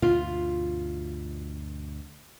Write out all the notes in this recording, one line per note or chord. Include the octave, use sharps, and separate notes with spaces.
D2 G2 B2 F4